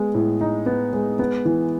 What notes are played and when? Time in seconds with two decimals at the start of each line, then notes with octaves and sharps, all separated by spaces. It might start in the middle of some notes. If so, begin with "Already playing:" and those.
Already playing: G#3 B3
0.14 A2
0.41 D#4
0.66 B3
0.93 G#3
1.19 B3
1.45 E3